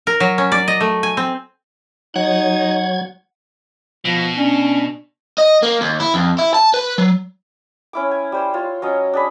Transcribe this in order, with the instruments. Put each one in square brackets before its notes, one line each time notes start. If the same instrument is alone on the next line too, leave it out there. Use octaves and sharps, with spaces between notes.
[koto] A#4
F#3
C#4
D5
D#5
A3
G#5
C4
[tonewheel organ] F#3 G#6 [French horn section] D#4 [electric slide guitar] F#5
[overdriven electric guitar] B2 [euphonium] F3
[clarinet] C#4 [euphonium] D4
[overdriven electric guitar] D#5
A#3
D#2
E4
F2
E4
A5
B4
F#3
[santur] C#4 E4 D6
G#5
G3 C5 C6
F4 C#5
F#3 C#4 D#5
D4 G#4 B5